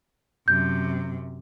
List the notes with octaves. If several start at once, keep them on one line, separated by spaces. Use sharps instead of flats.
F#2 C3 G6